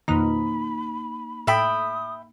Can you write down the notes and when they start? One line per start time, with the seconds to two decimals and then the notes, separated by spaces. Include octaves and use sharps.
0.08 F2 B2 D#3 A#3 D#4 B5
1.47 A2 E5 G5 B5 D#6 D7